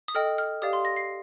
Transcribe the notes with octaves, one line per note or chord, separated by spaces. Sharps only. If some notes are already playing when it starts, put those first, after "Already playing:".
D#6
A4 D#5 G5 F6
F6
G4 D5 F5 D#6
C6
A#6
C7